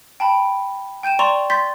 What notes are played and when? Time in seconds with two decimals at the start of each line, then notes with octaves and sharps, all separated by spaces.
0.20 G5 A5 B5
1.03 G5 G6 D#7 E7
1.19 D5 A#5 C6 C#6 E7 F7
1.50 C6 G6 A6 B6